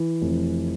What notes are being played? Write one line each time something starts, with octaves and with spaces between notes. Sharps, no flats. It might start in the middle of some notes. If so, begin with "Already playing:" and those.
Already playing: E3
F1